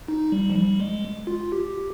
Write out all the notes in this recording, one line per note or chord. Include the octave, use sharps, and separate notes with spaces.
D#4
G3
F3
G3
G#3
F4
G4